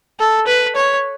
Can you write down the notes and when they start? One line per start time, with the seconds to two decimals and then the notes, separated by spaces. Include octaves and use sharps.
0.19 A4
0.47 B4
0.75 C#5